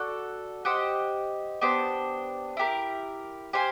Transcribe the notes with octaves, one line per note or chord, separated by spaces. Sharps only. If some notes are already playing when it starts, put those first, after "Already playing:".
Already playing: F#4 A4 D5 F#5
G4 C5 D#5 F#5
B3 D4 G4 C5
E4 G4 A#4
G4 C5 F5 G#5